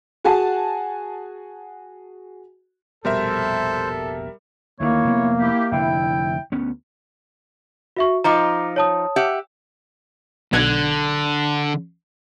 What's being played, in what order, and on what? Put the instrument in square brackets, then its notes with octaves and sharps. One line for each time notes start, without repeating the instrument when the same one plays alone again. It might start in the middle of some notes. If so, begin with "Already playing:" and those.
[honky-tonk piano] F#4 G#4 F#5 G#5 A5
[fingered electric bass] F1 A#1 B2 [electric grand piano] G3 A#4 E5 [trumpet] A4 [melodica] C5
[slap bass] D2 D#3 [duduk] A#3 [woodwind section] E4 C#5
[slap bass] F1 F2 B3
[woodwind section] E4 G4
[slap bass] F1 D3 [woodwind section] E4 G5
[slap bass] D2 B3 C#4
[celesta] F#4 E5 C#6
[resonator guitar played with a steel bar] F3 D#4 F4 [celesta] A#5 D6
[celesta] C#5 A5 D#6
[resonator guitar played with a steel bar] G4 E5 F#5
[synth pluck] B1 F#6 G#6 [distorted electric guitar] D3